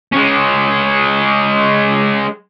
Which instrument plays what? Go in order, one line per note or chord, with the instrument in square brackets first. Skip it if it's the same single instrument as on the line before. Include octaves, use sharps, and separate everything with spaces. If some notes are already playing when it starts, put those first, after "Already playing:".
[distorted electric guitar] G#3 C#4